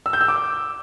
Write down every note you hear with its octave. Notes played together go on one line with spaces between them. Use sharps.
E6
G6
E6
D6